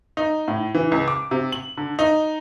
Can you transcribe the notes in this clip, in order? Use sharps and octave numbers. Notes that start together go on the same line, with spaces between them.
D#4
A2
E3
C#2
D6
C3
F#7
D3
D#4